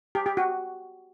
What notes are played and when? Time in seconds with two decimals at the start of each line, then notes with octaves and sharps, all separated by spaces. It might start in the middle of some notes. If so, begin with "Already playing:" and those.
0.15 G4
0.26 G4
0.37 F#4